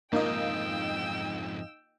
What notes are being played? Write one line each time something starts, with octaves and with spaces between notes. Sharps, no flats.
F2 G#2 A#3 D#4 F4 D#5 G5 E6